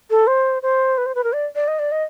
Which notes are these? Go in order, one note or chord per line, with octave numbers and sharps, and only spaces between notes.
A4
C5
C5
B4
C5
B4
A#4
D5
D5
D#5
D5
D#5